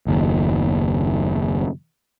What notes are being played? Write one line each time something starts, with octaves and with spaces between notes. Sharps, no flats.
F#1 D#2